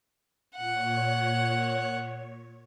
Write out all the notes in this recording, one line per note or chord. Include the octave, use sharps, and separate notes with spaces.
A#2 C#5 F#5